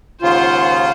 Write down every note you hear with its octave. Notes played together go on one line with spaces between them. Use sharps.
D#2 G#2 C#3 F4 C5 F#5